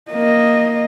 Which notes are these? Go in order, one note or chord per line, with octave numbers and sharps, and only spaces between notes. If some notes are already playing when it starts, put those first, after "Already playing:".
A#3 D#5